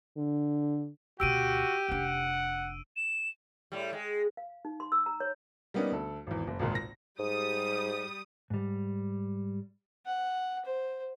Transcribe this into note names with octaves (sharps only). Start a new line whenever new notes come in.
D3
D2 B2 F#4 G4 E6 D7 D#7
F1 D4 F#5
E7
A2 G3
G#3
F5
D#4
C6
E6
A#5
C#5
G3 A#3 B3 C#4 D#4
D2 A4
G#1 E2
F#1
G#1 C#2 A#2
A#6
G#2 G3 D#6
G#2 G3
F#5
C5